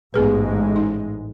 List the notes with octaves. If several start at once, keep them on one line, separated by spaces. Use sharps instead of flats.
A1 G#2 G#3 B3 G#4 B4
D#4